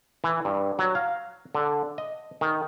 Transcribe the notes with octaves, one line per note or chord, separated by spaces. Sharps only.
E3
G2
F#3
F5
D3
D#5
D#3